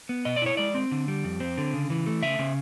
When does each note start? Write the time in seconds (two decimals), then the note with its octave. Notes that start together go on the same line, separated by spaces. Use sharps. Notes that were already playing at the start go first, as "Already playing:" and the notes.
0.09 B3
0.25 B2 D#5
0.36 D5
0.42 E4 C#5
0.57 G#3 D5
0.74 C4
0.92 D3
1.08 G3
1.24 F2
1.40 C4
1.58 D3
1.73 C#3
1.90 E3
2.06 A3
2.23 C#3 E5
2.39 C#3